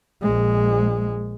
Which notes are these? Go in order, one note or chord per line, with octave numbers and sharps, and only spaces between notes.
A#1 G#3